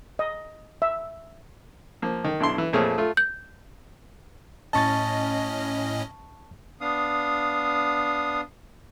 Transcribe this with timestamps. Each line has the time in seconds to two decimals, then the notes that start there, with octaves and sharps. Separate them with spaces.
0.19 D#5
0.82 E5
2.02 F3 A#3
2.24 D#3
2.40 B1 D4 E4 C6
2.58 E3
2.73 F2 A#2 F3 A3 G#4 C#5
2.98 A3 F4
3.17 G6
4.73 A2 C#4 D#5 A5 C#6 A6
6.81 B3 D4 F5 D#6